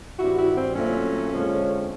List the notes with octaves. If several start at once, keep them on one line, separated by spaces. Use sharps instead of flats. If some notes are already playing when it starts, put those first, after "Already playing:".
G2 D#3 G3 C4 E4 F#4
E4 F#4
C4
A#2 F#3 A3 C4 C#4
F2 D3 F3 G#3